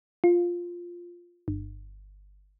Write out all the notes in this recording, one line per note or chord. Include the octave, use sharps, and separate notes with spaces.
F4
G1